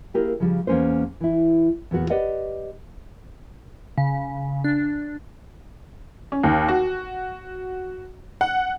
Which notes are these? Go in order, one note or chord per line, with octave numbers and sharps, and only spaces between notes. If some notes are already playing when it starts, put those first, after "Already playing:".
A#3 E4 G4 G#4 A#4
C#3 F3 G3
E2 A#3 C#4 B4 C5
E3 E4
E2 A#2 B3 F#4
G4 B4 D5 D#5 F#5
C#3
D4
C#4
D#2
F#4
F#5